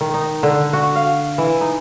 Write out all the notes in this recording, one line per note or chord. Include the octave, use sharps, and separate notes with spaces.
D#3
D#4
D3
F#4
F5
E3
D#4